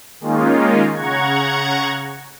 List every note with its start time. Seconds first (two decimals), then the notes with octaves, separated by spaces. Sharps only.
0.20 D#3 G#3 A#3 C#4 D#4 F4
0.94 C#3 F#5 A#5 C#6 G#6